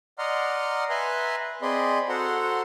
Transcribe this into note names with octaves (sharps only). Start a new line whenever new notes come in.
D5 D#5 F#5 A#5 C6 F6
B4 E5 G#5 A#5 C6 F#6
C4 G#4 D5 D#5 B5 C6
F#4 A4 C5 F#5 A#5 C6